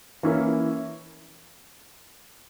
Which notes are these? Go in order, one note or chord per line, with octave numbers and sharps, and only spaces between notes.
E3 A#3 C#4 E4